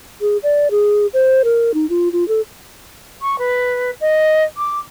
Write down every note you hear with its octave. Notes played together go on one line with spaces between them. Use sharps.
G#4
D5
G#4
C5
A#4
D#4
F4
F4
A4
C#6
B4
D#5
D6